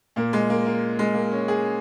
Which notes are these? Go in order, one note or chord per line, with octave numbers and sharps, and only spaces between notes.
A#2 A#3
G#3
A#3
A#3
G#3
A#3
C#4
G#4